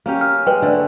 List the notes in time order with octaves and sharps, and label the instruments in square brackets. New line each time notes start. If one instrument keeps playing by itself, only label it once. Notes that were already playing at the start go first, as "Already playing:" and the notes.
[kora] A#3 C#4 G4
[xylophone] F6
[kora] G#3 [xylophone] B4 G5
[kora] D3 A3